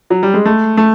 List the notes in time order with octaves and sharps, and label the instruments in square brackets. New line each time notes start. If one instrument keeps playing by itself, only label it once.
[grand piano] F#3
G3
G#3
A3
A3